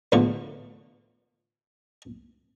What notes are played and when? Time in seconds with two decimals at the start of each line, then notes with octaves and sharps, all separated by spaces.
0.12 E2 A2 D3 F4 C#6